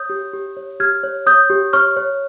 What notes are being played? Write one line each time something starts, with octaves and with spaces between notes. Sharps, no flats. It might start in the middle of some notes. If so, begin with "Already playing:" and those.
Already playing: C#5 D#6 G6
G4
G4
C#5
G4 F6 G#6
C#5
C#5 D#6 G6
G4
C#5 C#6 F6
C#5